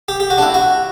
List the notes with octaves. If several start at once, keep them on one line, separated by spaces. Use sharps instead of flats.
G4
G4
F#4
D4
E4
F#4